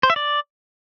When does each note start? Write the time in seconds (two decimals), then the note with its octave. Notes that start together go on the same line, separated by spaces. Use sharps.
0.03 C5
0.10 E5
0.16 D5